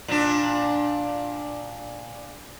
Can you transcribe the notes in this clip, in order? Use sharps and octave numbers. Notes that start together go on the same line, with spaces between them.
A#2 D4